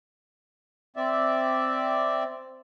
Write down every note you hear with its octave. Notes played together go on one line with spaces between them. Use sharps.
C4 D5 E5